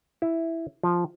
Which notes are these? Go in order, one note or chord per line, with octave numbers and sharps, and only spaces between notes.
E4
F3